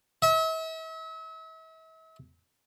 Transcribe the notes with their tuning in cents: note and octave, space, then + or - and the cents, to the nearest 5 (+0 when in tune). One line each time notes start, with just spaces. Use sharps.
E5 -40